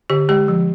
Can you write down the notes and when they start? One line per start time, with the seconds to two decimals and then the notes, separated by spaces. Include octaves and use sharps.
0.10 D3 G4
0.29 G#3 G4
0.48 F3